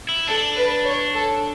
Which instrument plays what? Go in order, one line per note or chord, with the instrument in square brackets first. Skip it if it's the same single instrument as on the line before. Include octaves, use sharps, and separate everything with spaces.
[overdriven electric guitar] E4
[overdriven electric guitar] D4 [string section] A4
[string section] B4
C#5
A4